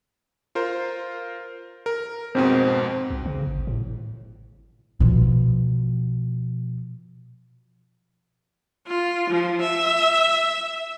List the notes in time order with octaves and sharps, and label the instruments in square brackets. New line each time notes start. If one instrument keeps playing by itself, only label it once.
[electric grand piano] F4 A#4 C5
A#4
[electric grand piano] F2 G#2 B2 [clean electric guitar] C4
[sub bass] C2
C#3
G#1
A2
[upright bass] B2 F3
[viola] F4
F3
E5